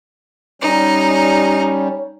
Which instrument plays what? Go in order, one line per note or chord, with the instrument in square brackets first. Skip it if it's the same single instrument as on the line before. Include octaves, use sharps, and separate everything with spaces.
[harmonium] G3 C#4 [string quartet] D#4